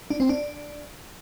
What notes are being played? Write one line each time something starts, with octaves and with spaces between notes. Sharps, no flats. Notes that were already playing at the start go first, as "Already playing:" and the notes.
D4
C4
D4